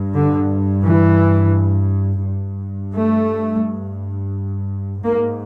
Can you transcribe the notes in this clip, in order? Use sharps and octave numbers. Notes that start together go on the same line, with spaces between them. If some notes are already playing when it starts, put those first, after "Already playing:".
Already playing: G2
D3
E3
G2
A3
G#2 A#3